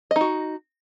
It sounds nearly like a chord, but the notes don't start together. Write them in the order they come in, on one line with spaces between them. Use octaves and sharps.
D#5 D#4 F#4